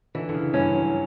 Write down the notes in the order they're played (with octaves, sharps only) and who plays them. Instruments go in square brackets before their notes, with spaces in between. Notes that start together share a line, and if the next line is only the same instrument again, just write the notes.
[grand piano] D3 [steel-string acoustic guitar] E3
[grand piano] D3
C#3
[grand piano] G2 [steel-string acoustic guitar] C#4
[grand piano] F#3